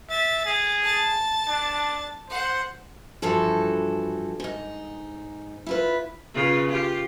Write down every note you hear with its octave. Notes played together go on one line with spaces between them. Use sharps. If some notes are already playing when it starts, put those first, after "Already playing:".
E5 A6
G#4
A5 A6
D4
C5 F#5
G2 E3 F3 F#4 A4 A5
G#2 D#4
E4 F4 B4
C#3 F4 B4
F4 G4